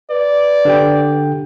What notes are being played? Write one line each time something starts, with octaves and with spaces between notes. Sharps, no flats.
B4 D5
D3 G4 G5